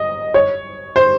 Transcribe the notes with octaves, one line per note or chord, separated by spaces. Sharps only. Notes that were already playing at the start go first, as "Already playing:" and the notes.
Already playing: D#5
C#5
C5